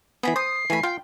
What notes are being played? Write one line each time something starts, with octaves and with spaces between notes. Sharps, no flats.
E3 B3 G#4 B5
C5 D#6 C7
E3 A3 G#5 B5
F4 G5